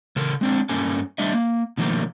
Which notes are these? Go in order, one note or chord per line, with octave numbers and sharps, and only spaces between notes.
C#3 A4 A#4
G#3 C4 D4
G2 A#3 C#4 A4 G#5
G3 A3 D4 D#5 E5
A#3
B2 D#3 F3 A3 A#3